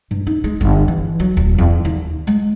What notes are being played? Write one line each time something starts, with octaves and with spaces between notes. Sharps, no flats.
G2
D#4
G#3
G1
E3
F#3
D1
E2
D#2
G#3